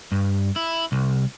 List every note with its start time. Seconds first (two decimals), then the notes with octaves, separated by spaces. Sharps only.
0.12 G2
0.56 E4
0.92 C2